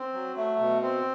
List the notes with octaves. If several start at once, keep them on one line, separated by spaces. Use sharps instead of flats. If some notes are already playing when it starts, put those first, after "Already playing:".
Already playing: C4
F#3
A3
B2
C4